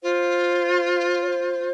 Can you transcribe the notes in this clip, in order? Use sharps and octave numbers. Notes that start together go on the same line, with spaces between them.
F4 C5
C#5
C5